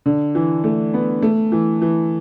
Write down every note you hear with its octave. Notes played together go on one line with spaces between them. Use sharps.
D3
E3
A3
B3
A3
E3
E3